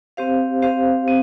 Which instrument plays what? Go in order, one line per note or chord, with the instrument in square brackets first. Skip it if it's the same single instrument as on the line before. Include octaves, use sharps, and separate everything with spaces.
[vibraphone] C4 G4 C5 F5
C4 G4 C5 F5
C4